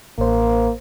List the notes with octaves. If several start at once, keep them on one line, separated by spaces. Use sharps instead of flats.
A1 A#3 C5